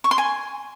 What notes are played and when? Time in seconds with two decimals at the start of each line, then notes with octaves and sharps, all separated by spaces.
0.04 C#6
0.11 C6
0.18 G#5